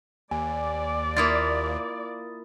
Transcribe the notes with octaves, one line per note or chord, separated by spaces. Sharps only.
D#2 D5 G#5
A#3 E4 F4 D#6 A6